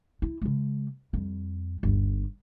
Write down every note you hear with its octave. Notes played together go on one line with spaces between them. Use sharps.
E4
C#3 G#3
F2 G3
G1 D#2